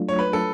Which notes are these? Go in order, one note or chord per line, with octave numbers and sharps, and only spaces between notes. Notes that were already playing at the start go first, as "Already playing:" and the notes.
Already playing: F#3 A3 D4 F4
C#5
B4
A4